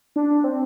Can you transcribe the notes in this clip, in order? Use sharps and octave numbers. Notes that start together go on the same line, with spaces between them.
D4
C4